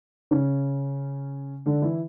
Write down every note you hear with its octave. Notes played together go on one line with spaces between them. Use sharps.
C#3 C#4
D3 D4
E3 E4